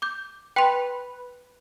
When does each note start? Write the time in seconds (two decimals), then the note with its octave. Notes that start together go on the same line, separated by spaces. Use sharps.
0.02 D6 G6
0.56 B4 G5 C6